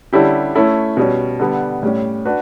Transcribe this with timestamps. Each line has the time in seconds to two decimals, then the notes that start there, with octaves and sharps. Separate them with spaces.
0.13 D3 G3 C#4 E4 G4
0.55 A3 C#4 E4 A4
0.97 B2 G3 C#4
1.39 D3 G3 B3
1.83 A2 G3 C#4
2.25 D4 F#4 B4